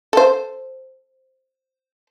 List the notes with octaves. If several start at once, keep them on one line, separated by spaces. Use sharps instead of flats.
A4 C5